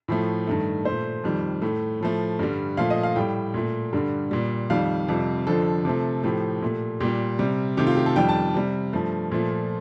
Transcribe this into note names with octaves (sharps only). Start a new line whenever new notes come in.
A2 F3 A3
G2 D#3 A3
A#2 A3 C5
F2 D#3 G3
A2 A3
A2 F3 A3
G2 D3 G3
A#2 F3 A3 F5
D#5
F5
A2 G3 G5
A#2 A3
G2 D3 G3
A#2 G3
F2 D#3 G3 F5
F2 C3 G3
F2 D3 F3 A4
C3 F3 A3
A2 F3 A3 G4
A#2 A3
A#2 G3 G4
C3 G3
C3 D#3 A3 G4
F4
G4
A4
F2 D#3 G3 G5
A5
C3 G3
G2 F3 A3
A#2 F3 A3